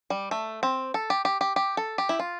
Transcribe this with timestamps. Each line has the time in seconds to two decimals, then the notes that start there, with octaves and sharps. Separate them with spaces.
0.10 G3
0.31 A3
0.63 C4
0.94 A4
1.10 G4
1.25 G4
1.41 G4
1.56 G4
1.77 A4
1.98 G4
2.09 E4
2.19 F4